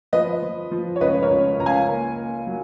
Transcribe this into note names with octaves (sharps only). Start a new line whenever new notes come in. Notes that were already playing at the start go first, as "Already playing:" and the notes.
F3 B4 D#5
F3
F3
C#5
C#2 B4 D#5
A#4 C#5
C#2
C#2 A#5
F5 G#5
A#3
A#3
F#3